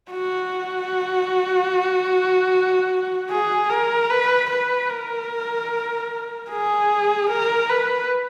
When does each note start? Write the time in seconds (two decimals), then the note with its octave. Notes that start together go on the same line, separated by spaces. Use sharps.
0.11 F#4
3.31 G#4
3.70 A#4
4.10 B4
4.51 B4
4.90 A#4
6.50 G#4
7.30 A#4
7.69 B4